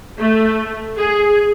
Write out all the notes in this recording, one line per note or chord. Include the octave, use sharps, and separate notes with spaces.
A3
G#4